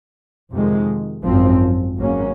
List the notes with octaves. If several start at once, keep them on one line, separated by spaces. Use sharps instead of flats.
F2 C3 D#3 G#3
G#1 F#2 F3 C4
G#1 G#2 F#3 A#3 C#4